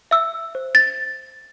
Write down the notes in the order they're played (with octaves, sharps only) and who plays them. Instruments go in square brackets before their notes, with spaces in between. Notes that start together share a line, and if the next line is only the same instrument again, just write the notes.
[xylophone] E5 E6
C5
A6